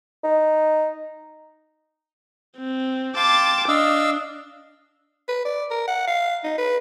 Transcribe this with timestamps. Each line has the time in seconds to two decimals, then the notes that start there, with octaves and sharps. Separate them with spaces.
0.24 D#4
2.58 C4
3.16 F5 G5 A5 C6 D6
3.68 D4 D#5 F5 E6
5.28 B4
5.45 D5
5.71 A#4
5.88 F#5
6.07 F5
6.44 D#4
6.58 B4